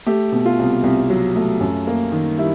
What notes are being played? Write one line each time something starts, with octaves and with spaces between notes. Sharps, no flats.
A3 G4
B2
F4
C2
C2
F#3
A3
F#2
A#3
D#3
G3 E4